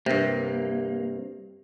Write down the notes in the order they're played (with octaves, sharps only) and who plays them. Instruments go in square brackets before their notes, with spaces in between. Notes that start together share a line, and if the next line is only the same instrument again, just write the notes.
[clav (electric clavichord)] G2 C3 [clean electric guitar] A#3